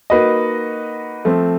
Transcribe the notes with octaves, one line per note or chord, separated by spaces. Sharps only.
A#3 D#4 F#4 B4 D#5
F3 A3 C4